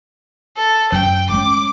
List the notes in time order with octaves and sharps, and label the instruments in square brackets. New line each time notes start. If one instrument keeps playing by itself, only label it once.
[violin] A4
[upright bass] F#2 [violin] G5
[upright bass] G#3 C#4 [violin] D6